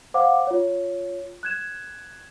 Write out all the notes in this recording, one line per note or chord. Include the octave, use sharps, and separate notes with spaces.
C5 F5 F#5 D6
F4 C#5
F#6 G#6 E7